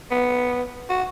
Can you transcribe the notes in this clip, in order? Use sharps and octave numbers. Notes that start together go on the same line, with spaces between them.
B3
F#4